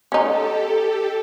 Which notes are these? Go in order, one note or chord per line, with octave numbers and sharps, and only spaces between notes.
C#4 D#4 G4 A4